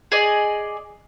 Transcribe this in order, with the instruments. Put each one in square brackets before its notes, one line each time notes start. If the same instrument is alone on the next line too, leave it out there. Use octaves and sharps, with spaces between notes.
[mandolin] G#4 D5 D#5